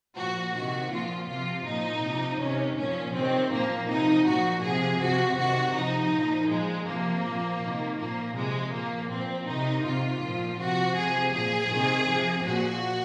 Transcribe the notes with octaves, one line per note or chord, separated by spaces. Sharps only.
A#2 F3 F#4
C3 D#3 F#4
A#2 F3 F4
C3 F3 F4
A#2 F3 D#4
C3 F3
C3 D#3 C#4
A#2 F3 C#4
C3 D#3 C4
A#2 F3 A#3
C3 F3 D#4
A#2 F3 F#4
C3 F3 G#4
C3 F3 F#4
C3 D#3 F#4
C3 F3 D#4
A#2 F3
A#2 F3 G#3
C3 F3 A#3
A#2 F3
C3 D#3
A#2 F3 A#3
C3 F3 G#3
A#2 F3 A#3
A#2 F3 C4
C3 D#3 D#4
C3 D#3 F4
A#2 F3
C3 F3 F#4
C3 F3 G#4
A#2 F3 G#4
C3 D#3
C3 F3
A#2 F3 F#4